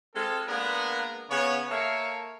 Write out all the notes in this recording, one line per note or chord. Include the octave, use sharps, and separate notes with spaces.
G#3 C4 F4 A4
G#3 A#3 B3 D4 A#4 B4
C#3 B3 C#5
A#3 A4 C#5 E5 F5